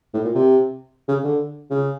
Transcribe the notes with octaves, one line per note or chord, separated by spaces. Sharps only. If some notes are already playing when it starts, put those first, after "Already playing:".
A2
A#2
C3
C#3
D3
C#3